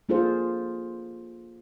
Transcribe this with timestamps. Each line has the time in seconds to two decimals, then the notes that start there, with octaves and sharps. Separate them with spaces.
0.09 A#3 D4 F4 G#4 A4 C5